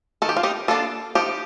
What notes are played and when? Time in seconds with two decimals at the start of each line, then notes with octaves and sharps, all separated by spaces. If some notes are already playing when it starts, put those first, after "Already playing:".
0.22 D#3 A4
0.29 G4
0.37 F4
0.43 D#4 G4
0.68 A#3 D4 F4 A4
1.15 F3 D#4 G4